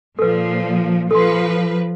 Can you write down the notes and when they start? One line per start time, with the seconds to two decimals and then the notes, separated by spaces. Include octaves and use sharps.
0.19 A#2 F3 A4 B4
1.11 F3 A4 B4 C6